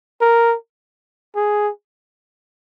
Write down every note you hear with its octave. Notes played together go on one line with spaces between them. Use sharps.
A#4
G#4